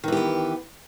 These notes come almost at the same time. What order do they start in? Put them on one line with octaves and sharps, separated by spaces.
D#3 E3 G4 B3